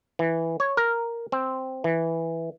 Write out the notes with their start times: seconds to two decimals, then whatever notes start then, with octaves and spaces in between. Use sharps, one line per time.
0.19 E3
0.60 C#5
0.77 A#4
1.32 C4
1.84 E3